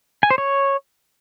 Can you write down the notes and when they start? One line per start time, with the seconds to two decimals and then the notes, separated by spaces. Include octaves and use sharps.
0.23 G#5
0.31 C5
0.38 C#5